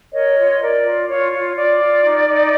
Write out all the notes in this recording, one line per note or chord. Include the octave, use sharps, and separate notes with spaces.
A#4 C#5 D#5
F4
A#4 D5
F4
F4 C#5
F4
F4 D5
F4
D#4
D#4